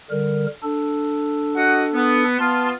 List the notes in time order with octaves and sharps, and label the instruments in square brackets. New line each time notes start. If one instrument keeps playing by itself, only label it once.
[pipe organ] D3 G3 A#4
D4 A4
[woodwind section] F#4 D#5 F#5
B3
[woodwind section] B3 F4 [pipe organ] A5 C6